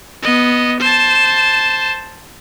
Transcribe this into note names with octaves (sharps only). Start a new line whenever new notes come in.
B3 D#5
C5 A5